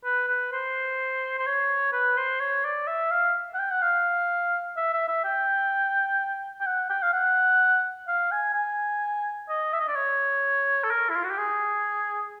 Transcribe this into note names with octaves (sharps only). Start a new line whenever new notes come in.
B4
B4
C5
C5
C#5
B4
C5
C#5
D5
E5
F5
F#5
G5
F#5
F5
E5
E5
E5
G5
G5
F#5
G5
F5
F#5
F5
G#5
G#5
D#5
E5
D#5
D5
C#5
A4
A#4
E4
F4
F#4
G4
G#4